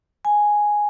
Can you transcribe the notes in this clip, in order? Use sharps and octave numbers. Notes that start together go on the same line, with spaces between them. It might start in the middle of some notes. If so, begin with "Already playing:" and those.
G#5